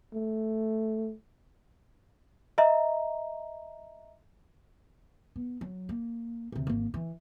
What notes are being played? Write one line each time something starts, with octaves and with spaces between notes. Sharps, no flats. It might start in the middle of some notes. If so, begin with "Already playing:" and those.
A3
D#5 E5 A#5
B3
F#3
A#3
D2 C3
G#1 A#3
E3